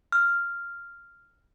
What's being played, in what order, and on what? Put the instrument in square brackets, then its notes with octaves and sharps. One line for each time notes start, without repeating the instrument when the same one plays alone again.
[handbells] F6